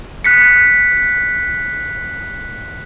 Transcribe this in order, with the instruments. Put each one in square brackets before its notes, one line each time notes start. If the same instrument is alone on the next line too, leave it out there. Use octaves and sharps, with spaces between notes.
[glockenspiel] F#6 B6 C#7